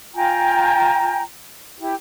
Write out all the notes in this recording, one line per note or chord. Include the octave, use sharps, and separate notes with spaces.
F4 G5 G#5 A#5
E4 G4